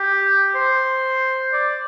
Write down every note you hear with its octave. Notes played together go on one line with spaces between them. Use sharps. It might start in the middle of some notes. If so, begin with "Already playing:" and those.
Already playing: G4
C5
D5